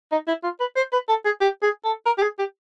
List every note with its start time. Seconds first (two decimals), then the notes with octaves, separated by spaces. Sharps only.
0.12 D#4
0.27 E4
0.43 F4
0.60 B4
0.76 C5
0.93 B4
1.09 A4
1.25 G#4
1.41 G4
1.63 G#4
1.85 A4
2.06 A#4
2.18 G4
2.22 G#4
2.39 G4